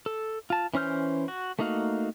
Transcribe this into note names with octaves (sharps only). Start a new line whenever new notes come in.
A4
F4 A5
E3 C#4 C5 F6 G6
F#4
A3 A#3 D#4 F#4 F5